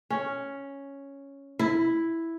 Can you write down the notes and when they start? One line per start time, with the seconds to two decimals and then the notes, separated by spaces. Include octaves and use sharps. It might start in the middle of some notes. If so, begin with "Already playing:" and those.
0.10 C#4
1.59 E4